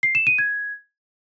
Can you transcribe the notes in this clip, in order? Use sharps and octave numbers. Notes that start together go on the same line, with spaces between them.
C7
E7
D#7
G#6